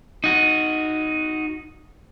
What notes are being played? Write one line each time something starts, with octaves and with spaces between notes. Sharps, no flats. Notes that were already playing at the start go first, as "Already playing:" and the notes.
D#4 F#4